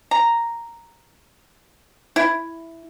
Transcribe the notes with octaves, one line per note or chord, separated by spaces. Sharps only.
A#5
E4